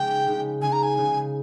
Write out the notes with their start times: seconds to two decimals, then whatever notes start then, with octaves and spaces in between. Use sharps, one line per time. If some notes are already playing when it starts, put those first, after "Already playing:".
Already playing: C#3 G#3 D#4 G5
0.26 C#3 G#3 D#4
0.62 C#3 G#3 D#4 G#5
0.73 A#5
0.83 G#5
0.98 C#3 G#3 D#4